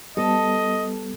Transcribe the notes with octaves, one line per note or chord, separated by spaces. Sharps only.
G3 B3 A4 D#5